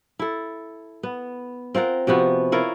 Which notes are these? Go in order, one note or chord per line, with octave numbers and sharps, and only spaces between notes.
E4 A4
B3
C4 F4 A#4 F#5
C3 F3 B3 F#4
E4 F4 A#4 C#5